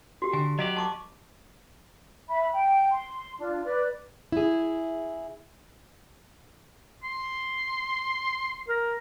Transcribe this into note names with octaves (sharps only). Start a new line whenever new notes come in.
F#4 G4
D3 G#5
F#3 G4 D5 D#5
A5 C#6 D6
E5 B5
G5
C6
D4 F4
B4 D5
E4 G#4
C6
A#4